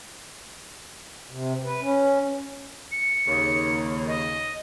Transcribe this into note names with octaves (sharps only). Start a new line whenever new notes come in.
C3
B4
C#4
C#7
D#2 C#3
D#5